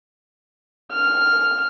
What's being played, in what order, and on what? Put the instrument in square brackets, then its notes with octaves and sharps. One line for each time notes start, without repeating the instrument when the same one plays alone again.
[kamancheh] F6